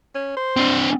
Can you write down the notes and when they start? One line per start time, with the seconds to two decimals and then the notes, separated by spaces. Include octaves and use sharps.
0.15 C#4
0.36 C5
0.57 C4 D4